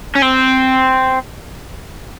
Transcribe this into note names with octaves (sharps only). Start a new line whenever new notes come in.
C#4
C4